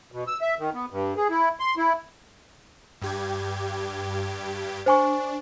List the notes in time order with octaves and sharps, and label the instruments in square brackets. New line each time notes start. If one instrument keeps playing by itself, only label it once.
[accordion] B2
E6
E5
D#3
B3
G2
G#4
E4
C6
E4
[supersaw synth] G2 G4 G#6
[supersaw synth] D4 [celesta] C5 G#5 C#6